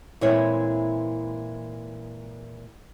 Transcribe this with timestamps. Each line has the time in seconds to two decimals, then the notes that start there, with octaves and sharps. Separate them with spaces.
0.21 A#2 E3 G#3 C4 E4 C#5